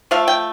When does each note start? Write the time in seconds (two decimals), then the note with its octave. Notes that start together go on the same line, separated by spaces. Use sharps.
0.11 F3 A3 F5
0.28 G5